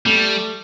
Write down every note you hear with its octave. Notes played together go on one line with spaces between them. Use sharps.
G3 A3